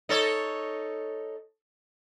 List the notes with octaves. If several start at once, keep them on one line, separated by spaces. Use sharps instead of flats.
D#4 A4 C#5